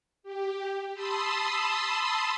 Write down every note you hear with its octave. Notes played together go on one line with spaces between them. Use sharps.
G4
A5 B5 C6 D#6 E6